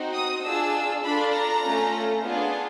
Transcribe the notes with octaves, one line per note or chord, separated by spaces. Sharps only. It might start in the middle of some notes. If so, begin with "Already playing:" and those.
Already playing: C4 D#4 F#4
D#6
D4 F4 G#4 E6
D4 F4 A4 B5
A#5
A3 C#4 F4
B3 D4 F4 G#4